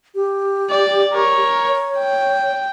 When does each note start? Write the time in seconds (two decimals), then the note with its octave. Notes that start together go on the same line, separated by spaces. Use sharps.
0.15 G4
0.71 D5
1.13 A#4 C#5
1.68 C#5
1.99 G5